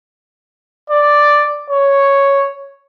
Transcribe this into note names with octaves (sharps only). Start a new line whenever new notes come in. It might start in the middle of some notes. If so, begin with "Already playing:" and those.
D5
C#5